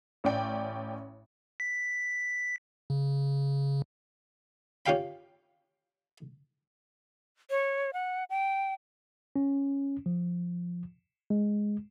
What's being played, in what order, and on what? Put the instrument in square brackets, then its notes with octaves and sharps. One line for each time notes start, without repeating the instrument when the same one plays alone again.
[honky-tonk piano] A1 C#4 D5 G5
[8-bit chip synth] B6
C#3
[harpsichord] C#4 F4 G4 F5 G5 B5
[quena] C#5
F#5
G5
[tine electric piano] C#4
F3
G#3